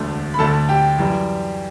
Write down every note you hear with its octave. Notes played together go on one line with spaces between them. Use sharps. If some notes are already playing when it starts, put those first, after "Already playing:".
Already playing: E1 D2 D3 A3
B5
D2 D3 A3 A4 A5
G4 G5
F#2 E3 G3